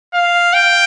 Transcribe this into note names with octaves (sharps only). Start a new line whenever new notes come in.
F5
G5